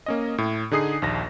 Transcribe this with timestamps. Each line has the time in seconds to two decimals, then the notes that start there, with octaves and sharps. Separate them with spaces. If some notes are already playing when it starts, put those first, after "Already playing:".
0.06 A#3 C#4 D#5
0.38 A2
0.71 D3 D#4 G#4 D#6 C7
1.02 A#1 D#2 A#6